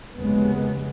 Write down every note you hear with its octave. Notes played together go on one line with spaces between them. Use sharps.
F1 D#2 C#3 G#3 B3